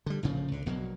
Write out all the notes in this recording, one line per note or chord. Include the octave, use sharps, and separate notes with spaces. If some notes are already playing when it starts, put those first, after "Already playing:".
D3 G3
A#1 A2 C#3 F3
C#2 D3
A#1 B2 F#3 A#3